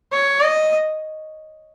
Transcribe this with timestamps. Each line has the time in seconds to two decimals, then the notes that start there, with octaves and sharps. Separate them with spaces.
0.12 C#5
0.42 D#5